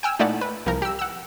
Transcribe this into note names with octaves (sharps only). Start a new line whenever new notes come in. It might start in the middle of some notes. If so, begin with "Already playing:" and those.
G5 G#5 E6 F6
A#2 A3 D#4 E4 D5 F#5
B4
C2 F3 A#4
G4 E6
F#5 E6